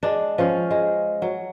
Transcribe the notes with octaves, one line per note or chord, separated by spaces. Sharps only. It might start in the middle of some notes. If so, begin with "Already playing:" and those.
G#3 D4
F3 C#4 F5
G#3
F#3